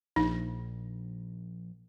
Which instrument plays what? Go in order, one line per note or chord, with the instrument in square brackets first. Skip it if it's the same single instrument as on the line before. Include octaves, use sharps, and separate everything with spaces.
[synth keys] A#1 [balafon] D#4